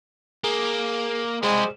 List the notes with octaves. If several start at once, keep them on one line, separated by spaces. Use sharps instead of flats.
A#3 G#4
G3 G#3 C4 G#4 C5